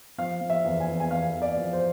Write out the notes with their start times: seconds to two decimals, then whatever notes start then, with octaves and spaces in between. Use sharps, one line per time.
0.18 F3 F5
0.41 F3
0.50 E5
0.65 E2
0.80 G#5
0.88 E2
1.00 G#5
1.11 E2 F5
1.35 E2
1.42 D5
1.57 F3
1.73 C5